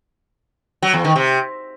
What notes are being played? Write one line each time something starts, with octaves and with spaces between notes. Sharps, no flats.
F#3
E2
D#3
C3